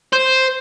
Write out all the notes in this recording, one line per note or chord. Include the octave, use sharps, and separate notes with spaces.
C5